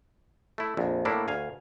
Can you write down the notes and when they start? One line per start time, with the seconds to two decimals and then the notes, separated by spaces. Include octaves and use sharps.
0.58 A3 E4
0.77 A#1 F2
1.05 A2 A#3 D4 E4
1.28 D2 F5 G#5